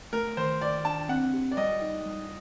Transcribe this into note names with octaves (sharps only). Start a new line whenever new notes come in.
A3 A#4
D#3 C5
D#3 D5
D4 A5
C4 F#5
G4
D5
G3 D#5
D#4
G3